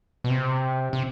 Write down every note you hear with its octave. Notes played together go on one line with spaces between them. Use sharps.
B2
C3
C3